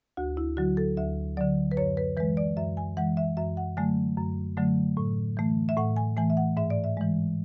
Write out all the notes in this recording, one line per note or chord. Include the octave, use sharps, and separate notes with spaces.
D2 F#4
E4
D3 F#3 F#4
A4
D2 E5
D3 F#3 D5
B4
F#2 C#5
B4
E3 G#3 B4
D5
F#2 E5
G#5
E3 G#3 F#5
E5
F#2 E5
F#5
D3 F#3 A3 G#5
F#2
D3 F#3 A3
A2
E3 A3
E5
A2 F#5
G#5
E3 A3 G#5
E5
F#5
G#2 E5
D5
E5
E3 G#3